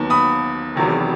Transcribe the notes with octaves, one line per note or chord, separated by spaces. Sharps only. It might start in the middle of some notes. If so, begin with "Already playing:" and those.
Already playing: D#2 D#3 F#3 B3
B5 D#6
E1 E2 C3 D#3 F#3